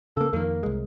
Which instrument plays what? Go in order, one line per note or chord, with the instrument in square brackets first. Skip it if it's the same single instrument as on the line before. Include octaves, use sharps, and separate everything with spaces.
[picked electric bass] C#3 A#3 [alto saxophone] A4
[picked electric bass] F2 D#3 [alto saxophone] A#3
[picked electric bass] C2 G#3